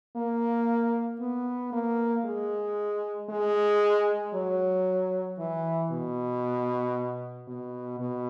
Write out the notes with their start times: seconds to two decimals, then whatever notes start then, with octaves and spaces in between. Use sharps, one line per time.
0.16 A#3
1.21 B3
1.72 A#3
2.25 G#3
3.30 G#3
4.34 F#3
5.39 E3
5.91 B2
7.48 B2
8.00 B2